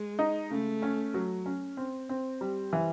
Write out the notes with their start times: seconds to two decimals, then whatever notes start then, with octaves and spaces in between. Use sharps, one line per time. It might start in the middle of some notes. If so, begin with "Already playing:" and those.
Already playing: G#3
0.19 D#4
0.50 C#3 A3
0.82 C#4
1.14 F#3
1.46 C#4
1.77 C4
2.09 C4
2.41 G3
2.73 E3